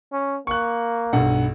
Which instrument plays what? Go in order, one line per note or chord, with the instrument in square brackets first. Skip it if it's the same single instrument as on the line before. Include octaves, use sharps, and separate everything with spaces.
[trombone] C#4
[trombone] A#3 [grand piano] C#6 F#6
[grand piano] B1 G2 F#5